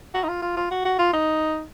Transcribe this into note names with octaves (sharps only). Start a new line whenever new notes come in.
F#4
D#4
F4
F4
F4
F#4
F#4
F4
D#4